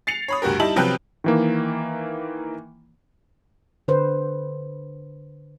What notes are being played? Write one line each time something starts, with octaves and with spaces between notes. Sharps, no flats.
A6 C7 C#7 F7
C#5 B5 D#6
D2 G2 F#4 G4 A#4
G3 D#4 E4 A5 F#7
C3 F3 F#3 B4 G5 F#6
D#3 E3 A#3
D3 B4 C5